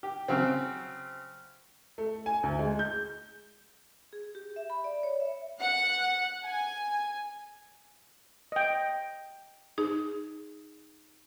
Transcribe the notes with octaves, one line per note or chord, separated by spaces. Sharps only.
G4
C#3 F#3 C4
A3
G#5
D2
G#3
G6
G#4
G4
E5
B5
D5
C#5
E5
F#5
G#5
D#5 G5
D#4 G#4